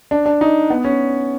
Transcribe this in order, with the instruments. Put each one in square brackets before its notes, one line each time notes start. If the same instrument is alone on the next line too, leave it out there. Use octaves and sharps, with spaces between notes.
[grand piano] D4
D4
D#4
B3
C#4